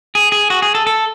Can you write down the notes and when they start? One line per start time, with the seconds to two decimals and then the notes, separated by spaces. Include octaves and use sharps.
0.15 G#4
0.32 G#4
0.50 F#4
0.62 G#4
0.75 A4
0.87 A4